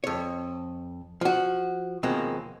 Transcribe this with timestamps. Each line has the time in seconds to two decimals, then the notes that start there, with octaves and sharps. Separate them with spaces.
0.04 F2 C#5
1.21 F3 F#4
2.03 D#2 B2 F3 G#3 A#3 C4